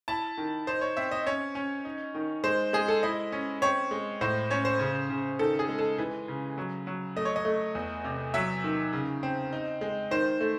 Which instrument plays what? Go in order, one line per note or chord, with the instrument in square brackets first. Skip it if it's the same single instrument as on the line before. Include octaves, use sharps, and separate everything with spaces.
[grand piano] E4 A5
D#3
D#4 C5
C#5
C4 E5
D#5
C#4 C#5
C#4
D#4
D#3
G#3 C5
G#3 G#4
A4
E4 D#5
C#4
C4 C#5
G#3
A2 C5
C#4 C#5
C5
C#3
C#3
D#3 A4
G#4
G#3
A4
E3
C#3
F#3
F#3
A3 D#5
C#5
D#5
A3
E2
C3
F#3 E5
D#3
C#3
C4
D#4
G#3
D#3 C5
A3